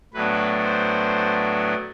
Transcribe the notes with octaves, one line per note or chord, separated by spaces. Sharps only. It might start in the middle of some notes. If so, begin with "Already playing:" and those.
A2 F#3 B3 D4 B4
C5